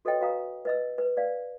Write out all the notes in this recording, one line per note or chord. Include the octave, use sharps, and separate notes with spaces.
F#4 A4 B4 C#5 D#5 G5
F#4 B4 F5 A#5 D#6
B4 D#5 E6
B4
B4 D5 F5